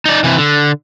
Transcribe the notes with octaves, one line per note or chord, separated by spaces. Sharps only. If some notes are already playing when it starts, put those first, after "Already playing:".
D#4 D5
C3 E3
D3